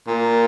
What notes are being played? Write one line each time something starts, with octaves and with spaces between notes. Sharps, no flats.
A#2